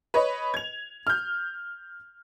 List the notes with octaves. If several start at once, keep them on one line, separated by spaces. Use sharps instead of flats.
B4 C#5 D#5
G#6 F7
F6 G6